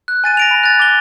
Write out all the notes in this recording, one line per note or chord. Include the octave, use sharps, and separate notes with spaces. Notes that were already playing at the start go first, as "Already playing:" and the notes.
F#6
G#5 A6 D#7
A#6 D7 F7
B5
F#6 A6
D6 G7